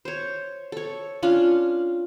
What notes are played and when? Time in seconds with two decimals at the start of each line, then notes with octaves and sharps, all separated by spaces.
0.05 C5 C#5
0.72 A4 C#5
1.23 C#4 D4 F4